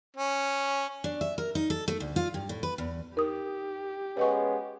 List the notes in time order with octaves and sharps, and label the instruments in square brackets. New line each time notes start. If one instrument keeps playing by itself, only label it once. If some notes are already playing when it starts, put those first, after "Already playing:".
[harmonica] C#4
[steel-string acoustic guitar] D4
E5
A#4
D#4
A4
A3
D2
F4
G2
A2
B4
E2
[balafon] D#4 [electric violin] G4 [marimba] A#4 D#6
[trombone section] G#3 B3 C#4 [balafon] B4 D#5 C#6